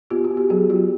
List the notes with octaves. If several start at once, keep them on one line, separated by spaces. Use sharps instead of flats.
B3 F4 G4
F#4
B3
G4
F#3 F#4 G#4
F#3 F4 G4